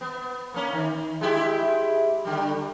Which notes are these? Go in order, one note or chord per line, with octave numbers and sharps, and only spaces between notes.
B3
A#3 C#4
D#3
G#3 E4 G4
D3 G3